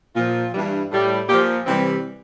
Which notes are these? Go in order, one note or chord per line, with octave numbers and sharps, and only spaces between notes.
A#2 F3 F4
G2 E3 G3
A2 G3
A#2 F3 G4
C3 E3 G3 C4